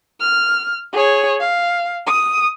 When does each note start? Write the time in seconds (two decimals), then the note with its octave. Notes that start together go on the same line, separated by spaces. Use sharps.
0.20 F6
0.93 G#4 C#5
1.40 F5
2.06 D#6